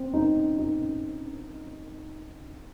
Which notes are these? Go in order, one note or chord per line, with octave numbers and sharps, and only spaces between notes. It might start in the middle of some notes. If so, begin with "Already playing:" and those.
Already playing: C4
D#4
D#4